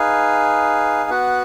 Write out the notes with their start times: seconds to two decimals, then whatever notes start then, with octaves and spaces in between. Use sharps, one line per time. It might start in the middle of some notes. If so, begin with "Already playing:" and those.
Already playing: D#4 G#4 B4 F5 G#5
1.10 B3 F#4 B4 F#5